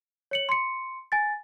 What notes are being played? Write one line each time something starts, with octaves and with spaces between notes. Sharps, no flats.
C#5 C#7 F#7
C6 C#7
G#5 A6